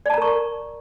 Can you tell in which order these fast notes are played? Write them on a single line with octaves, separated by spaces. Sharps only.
D5 A5 A#5 A#4 C#6